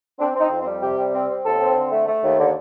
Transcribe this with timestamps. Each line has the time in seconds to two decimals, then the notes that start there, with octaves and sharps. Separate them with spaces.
0.19 C4 D4
0.35 C4 D#4
0.50 F2
0.61 C4
0.66 G3
0.82 C3 G4
0.98 G3
1.13 C4
1.29 C4
1.45 D#2 A4
1.60 C4
1.76 D3
1.92 A3
2.07 A3
2.23 D#2
2.39 D3